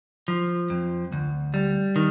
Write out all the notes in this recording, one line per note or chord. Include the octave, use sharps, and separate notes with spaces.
F3
F2
D2
G3
D#3